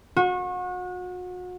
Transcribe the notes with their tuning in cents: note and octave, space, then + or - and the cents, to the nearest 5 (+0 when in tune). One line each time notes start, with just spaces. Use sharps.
F#4 -35